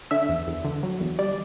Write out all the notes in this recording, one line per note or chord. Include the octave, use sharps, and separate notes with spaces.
D3 E5
E2
E2
D3
F#3
E2
G3 D5